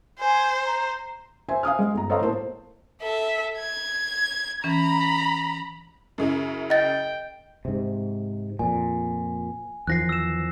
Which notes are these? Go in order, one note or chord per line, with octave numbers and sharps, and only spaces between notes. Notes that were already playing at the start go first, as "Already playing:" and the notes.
C5 G#5
A#5
C5 E5 G#5
F5 G#5 D#6 F6
G#3
G1 A#5
A4 C5 C#5 D#5 F5 A#5
A2 A#3 C5 A5
A4 E5
G#6
E3 C#4 A#5 B5
F#2 C#3 E4
D#5 G5 A6
G#2 C3
F2 A#2 G#5
E2 D#3 F3 F#6 A#6 C7
E6 E7